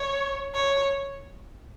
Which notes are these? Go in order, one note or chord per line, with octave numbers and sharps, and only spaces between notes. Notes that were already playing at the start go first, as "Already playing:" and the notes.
Already playing: C#5
C#5